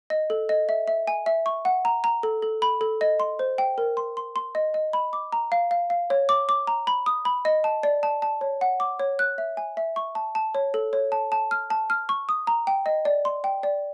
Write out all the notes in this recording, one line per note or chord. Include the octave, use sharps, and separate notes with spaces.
D#5
A4
D#5
E5
E5
G#5
E5
C#6
F#5
A#5
A#5
A4
A4
B5
A4
D#5
C6
C5
G5
A#4
C6
C6
C6
D#5
D#5
B5
D6
A#5
F5
F5
F5
C#5
D6
D6
A#5
B5
D#6
B5
D#5
A5
D5
A5
A5
C#5
F#5
D6
C#5
F#6
E5
G#5
E5
C#6
A5
A5
C#5
A4
C#5
A5
A5
F6
A5
F6
C#6
D#6
A#5
G5
D#5
D5
C6
G5
D5